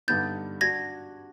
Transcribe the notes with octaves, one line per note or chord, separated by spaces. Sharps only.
G2 D3 G3 B3 D#4 G6 A6
D4 F#4 G#6 A#6